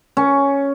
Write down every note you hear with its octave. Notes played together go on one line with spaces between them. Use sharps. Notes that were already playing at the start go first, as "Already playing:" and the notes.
C#4